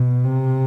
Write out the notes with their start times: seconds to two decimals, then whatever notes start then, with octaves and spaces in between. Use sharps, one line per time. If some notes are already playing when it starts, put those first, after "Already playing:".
Already playing: B2
0.24 C3